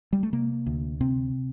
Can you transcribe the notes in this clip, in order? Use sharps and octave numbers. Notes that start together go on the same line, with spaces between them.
G3
A3
C3 A#3
D2
C3 C4